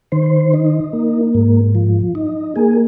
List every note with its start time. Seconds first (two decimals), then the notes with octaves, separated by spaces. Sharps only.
0.12 D#3 C5
0.53 D#4
0.93 A#3
1.34 G#2
1.75 F3
2.15 D#4
2.56 A#3 G#4